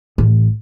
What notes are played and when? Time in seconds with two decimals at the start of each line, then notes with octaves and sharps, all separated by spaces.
0.18 A1